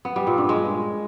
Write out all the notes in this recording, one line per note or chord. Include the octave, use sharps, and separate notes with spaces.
B3
G3
A#2
G2
G#3